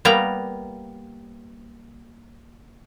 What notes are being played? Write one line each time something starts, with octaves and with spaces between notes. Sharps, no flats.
G3 A#3 B3 A#5